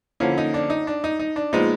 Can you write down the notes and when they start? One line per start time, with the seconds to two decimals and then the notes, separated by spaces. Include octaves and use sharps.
0.20 D3 F3 A#3 C#4 E4
0.38 D#4
0.54 D4
0.70 D#4
0.87 D4
1.04 D#4
1.19 D#4
1.36 D4
1.53 A#2 F3 G#3 B3 D#4